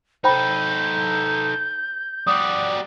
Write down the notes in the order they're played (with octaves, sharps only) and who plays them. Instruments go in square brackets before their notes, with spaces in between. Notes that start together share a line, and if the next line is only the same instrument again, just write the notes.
[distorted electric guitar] D#4 A4 [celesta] C5 G5 B5 [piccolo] G6
[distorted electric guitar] G3 F#4 [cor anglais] D5 [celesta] D#6